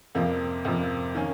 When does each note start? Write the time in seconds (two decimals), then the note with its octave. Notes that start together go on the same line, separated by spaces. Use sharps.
0.15 F2 C3 F3 A#3
0.65 F2 C3 F3 A#3
1.15 D#3 A#3 C#4